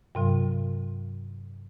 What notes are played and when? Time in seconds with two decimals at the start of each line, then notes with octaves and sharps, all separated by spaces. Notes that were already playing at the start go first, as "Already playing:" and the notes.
0.15 G2 C3 F#3